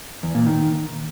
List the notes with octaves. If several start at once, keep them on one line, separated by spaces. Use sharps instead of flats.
E2
A#2
D#3